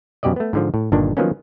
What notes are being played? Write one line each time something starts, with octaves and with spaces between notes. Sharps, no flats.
F#2 B2 G4 D5 D#5
A3 B3
G#2 D3 F3
A2
G1 G2 A#2 D#3 D4
D#3 F3 F#3 A#3 B3 C#4